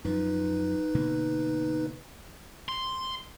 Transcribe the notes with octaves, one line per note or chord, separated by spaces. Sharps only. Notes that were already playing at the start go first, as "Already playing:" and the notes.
F#2 F3 D#4 B4
B2 D3 A#3
C6